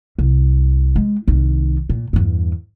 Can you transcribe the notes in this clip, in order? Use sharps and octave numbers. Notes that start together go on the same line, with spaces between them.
C2
G#3
C2 D#3
A#2
E2 G2